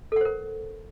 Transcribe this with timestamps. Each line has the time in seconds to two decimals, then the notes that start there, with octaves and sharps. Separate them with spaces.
0.12 A4
0.16 F#5
0.21 C5
0.25 A#4